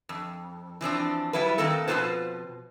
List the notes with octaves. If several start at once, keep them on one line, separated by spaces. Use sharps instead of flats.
F2
E3 F3 C4 D4
F#3 G3 E4 F4 B4
D#3 A3 A#3 C4 A4
F2 B2 G3 F4 B4 C5